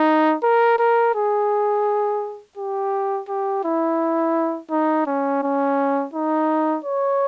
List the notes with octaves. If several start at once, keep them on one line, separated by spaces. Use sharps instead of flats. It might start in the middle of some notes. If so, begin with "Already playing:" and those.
Already playing: D#4
A#4
A#4
G#4
G4
G4
E4
D#4
C#4
C#4
D#4
C#5